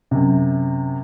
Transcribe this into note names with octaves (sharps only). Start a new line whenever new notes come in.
F#2 C3